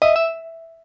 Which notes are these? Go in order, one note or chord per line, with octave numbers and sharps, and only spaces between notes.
D#5 E5
E5